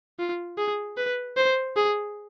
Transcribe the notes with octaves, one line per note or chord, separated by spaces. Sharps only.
F4
G#4
B4
C5
G#4